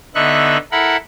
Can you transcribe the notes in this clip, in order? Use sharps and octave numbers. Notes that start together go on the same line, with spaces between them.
D3 B3 D#4 E5 C#6 F#6
E4 A4 A#4 F#5 B5